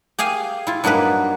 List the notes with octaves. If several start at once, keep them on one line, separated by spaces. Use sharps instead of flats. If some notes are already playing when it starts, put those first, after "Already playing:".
G4 G#4 F5 G#5
E4 F4
G2 F#3 A#3 D#4 B4